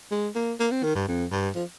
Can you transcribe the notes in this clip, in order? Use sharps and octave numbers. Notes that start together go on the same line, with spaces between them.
G#3
A#3
A#3
C4
D#3
G2
F2
G2
F3